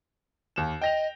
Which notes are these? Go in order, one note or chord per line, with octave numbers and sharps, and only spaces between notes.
D#2 E7
D#5 G5 A#6 F7